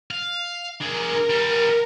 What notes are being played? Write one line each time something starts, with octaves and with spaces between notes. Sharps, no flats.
F5
D4 G#4 A#4
G3 B3